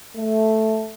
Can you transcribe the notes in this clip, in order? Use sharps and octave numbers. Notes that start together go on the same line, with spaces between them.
A3